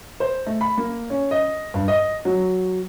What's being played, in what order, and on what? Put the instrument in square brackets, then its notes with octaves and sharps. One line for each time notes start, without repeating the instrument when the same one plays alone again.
[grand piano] C5
A3
B5
A#3
C#4
D#5
G2
D#5
F#3